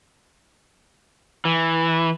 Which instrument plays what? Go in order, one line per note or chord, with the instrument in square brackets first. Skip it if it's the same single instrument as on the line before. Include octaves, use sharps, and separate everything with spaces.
[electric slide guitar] E3